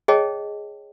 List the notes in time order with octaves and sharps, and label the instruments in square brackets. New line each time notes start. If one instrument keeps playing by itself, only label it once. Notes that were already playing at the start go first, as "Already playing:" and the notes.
[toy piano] G#4 C#5 D#5 G5 A5